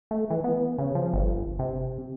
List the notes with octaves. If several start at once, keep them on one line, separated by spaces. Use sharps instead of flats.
A3
E3
B3
C#3
F3
G1
C3